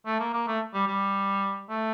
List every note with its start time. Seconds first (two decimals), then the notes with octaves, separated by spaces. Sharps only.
0.06 A3
0.19 A#3
0.33 A#3
0.47 A3
0.74 G3
0.87 G3
1.69 A3